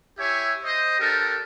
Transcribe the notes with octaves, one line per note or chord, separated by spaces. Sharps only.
E4 G4 C#5 E5 G#5
C5 D#5
D4 G4 A4 A#4